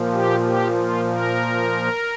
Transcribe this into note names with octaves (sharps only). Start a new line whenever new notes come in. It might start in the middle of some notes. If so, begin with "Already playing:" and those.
Already playing: A#2 F3
G4
G4
F4
A#4